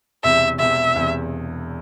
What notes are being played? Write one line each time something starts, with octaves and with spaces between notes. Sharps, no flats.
E1 E2 C3 E5
E1 E2 C3 E5
E1 E2 C3